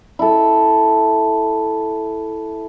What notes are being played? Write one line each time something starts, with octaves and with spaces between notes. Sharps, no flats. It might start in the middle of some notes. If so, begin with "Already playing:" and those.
E4 A4